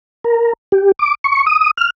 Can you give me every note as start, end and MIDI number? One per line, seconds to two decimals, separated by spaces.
0.24 0.53 70
0.72 0.92 67
0.99 1.15 86
1.24 1.46 85
1.47 1.71 87
1.77 1.90 89